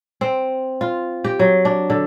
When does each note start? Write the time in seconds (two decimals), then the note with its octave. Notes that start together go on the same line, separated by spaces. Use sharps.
0.21 C4
0.81 F4
1.24 G4
1.39 F#3
1.65 D4
1.90 D3